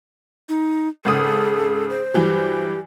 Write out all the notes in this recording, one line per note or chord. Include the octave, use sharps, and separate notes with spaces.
D#4
G#1 C#3 G#4 A4 D#6
C5
G2 E3 F#3 G4